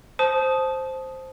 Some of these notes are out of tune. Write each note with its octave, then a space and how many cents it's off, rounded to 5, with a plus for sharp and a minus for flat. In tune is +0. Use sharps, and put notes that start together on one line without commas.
C5 +0 A5 -20 D#6 +0